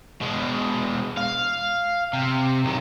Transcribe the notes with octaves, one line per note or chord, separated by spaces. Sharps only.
B2 G#3
F5
C3
B1 D#3